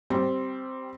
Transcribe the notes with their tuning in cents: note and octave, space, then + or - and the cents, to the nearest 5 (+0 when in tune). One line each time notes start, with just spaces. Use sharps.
G3 -15 C4 +0